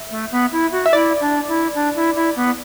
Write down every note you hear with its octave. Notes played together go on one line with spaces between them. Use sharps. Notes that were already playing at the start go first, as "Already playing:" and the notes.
Already playing: E5
A3
B3
E4
F#4
E5
E4 D5
D4
E4
D4
E4
E4
B3